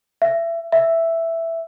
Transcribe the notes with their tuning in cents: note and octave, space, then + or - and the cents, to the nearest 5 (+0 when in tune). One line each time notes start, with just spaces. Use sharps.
E5 +25
E5 +5